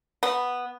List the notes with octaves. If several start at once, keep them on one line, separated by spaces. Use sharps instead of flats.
B3